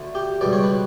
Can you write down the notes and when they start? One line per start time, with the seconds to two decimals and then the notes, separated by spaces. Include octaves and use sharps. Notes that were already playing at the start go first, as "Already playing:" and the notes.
Already playing: D2 D3 A3
0.15 G4
0.41 C#2 B2 G3 D5
0.53 C#5
0.63 B4